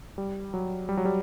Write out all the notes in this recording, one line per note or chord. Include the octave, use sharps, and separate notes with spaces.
G3
F#3
G3
F#3
G3